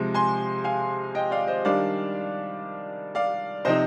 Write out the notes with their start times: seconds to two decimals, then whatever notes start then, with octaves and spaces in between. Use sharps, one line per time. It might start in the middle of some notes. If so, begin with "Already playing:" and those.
Already playing: C3 F3 G#3
0.14 G#5 C6
0.64 F5 G#5
1.15 D#5 G5
1.31 D5 F5
1.47 C5 D#5
1.65 D#3 G3 D4 D5 F5
3.15 D5 F5
3.65 C3 F3 C4 D#4 C5 D#5